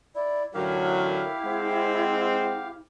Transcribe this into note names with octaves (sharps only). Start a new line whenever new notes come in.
E4 D5
A1 D3 F#3 E4 G4 A#4 F5
G#3 C4 F#5